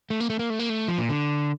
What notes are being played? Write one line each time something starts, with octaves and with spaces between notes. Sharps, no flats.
A3
A#3
A3
A#3
A3
A#3
A3
F3
A#2
D3